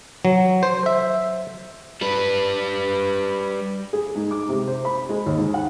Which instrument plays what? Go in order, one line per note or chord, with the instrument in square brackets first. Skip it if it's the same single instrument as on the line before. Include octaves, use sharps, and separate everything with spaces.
[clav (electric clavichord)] F#3
C5
E5
[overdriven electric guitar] G3 B4
[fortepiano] G#4
G#2
D6
C3
C5
B5
G#3
D#2
G#2
F#5